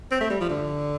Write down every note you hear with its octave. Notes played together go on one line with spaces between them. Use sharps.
C4
A3
G3
F3
D3